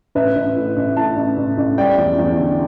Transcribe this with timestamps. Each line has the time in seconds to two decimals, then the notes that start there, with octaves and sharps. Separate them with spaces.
0.15 A1 B4 E5
0.36 A1
0.56 A2
0.77 A1
0.97 A2 E5 A5
1.17 A1
1.37 A1
1.58 A1
1.78 G3 D5 G5
1.98 E2
2.19 E2
2.39 D3